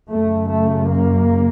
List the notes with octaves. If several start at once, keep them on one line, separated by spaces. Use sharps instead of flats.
F#2 C#3 A3
A3
A#3